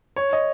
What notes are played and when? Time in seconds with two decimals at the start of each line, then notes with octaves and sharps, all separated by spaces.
0.16 C#5
0.33 D#5